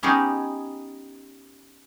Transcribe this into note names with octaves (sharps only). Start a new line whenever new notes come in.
B3 C#4 D#4 G4 G#4